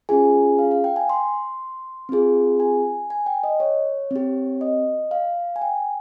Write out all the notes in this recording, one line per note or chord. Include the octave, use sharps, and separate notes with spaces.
C#4 F4 G#4 G#5
F5
F5
G5
G#5
C6
C4 F4 G#4
G#5
G#5
G5
D#5
C#5
C4 G4
D#5
F5
G#5
G5